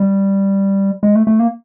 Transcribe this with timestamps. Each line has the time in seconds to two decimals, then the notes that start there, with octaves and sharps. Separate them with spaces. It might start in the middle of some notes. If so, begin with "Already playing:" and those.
Already playing: G3
1.03 G#3
1.15 A3
1.27 A3
1.40 A#3